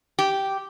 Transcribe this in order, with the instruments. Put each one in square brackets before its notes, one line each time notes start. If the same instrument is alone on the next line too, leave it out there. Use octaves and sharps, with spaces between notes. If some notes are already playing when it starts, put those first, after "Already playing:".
[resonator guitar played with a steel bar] G4